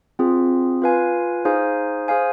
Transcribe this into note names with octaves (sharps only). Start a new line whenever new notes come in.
C4 F4 G#4
F4 B4 F5 G#5
D#4 G#4 C5 F5 G#5
G#4 C5 F5 G#5